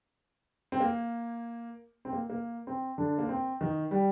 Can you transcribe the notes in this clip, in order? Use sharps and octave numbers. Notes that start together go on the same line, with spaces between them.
C4
A#3
C4
A#3
A#3
C4
D3 D4
A#3
C4
D#3 D#4
G3 G4